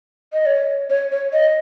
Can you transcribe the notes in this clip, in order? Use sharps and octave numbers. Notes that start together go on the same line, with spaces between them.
D#5
C#5
C#5
C#5
D#5